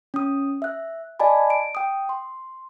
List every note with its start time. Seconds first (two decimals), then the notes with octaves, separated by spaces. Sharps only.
0.14 C#4 D#6
0.62 E5 F#6
1.19 D5 D#5 G#5 A5 B5
1.50 D7
1.75 G5 D#6
2.09 C6